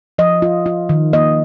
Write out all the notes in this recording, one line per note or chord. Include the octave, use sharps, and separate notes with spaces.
F3 D#5
F4
F4
D#3
A#3 D#5